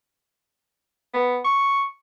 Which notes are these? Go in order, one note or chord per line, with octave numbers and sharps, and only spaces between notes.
B3
C#6